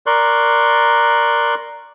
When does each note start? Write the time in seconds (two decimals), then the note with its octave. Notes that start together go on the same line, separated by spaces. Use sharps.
0.06 A#4 D5 C6 C#6 F#6